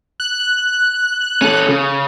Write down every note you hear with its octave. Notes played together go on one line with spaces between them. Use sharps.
F#6
C#4 A4
C#3